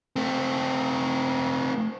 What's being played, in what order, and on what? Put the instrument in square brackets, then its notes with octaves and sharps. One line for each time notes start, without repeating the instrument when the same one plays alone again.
[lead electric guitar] A3 C4